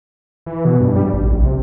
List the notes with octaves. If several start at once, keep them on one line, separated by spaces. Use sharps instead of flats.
E3
B2
G2
G3
A1
A#1
C3